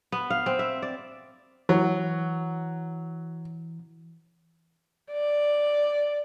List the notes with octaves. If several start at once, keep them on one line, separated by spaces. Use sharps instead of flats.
B3
F5
C4
E5
D5
E3 F#3
D5